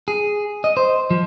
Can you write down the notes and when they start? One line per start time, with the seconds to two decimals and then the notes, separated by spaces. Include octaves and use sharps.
0.08 G#4
0.64 D#5
0.77 C5
1.10 F3